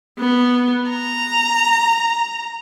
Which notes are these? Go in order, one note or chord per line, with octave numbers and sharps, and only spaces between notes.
B3
A#5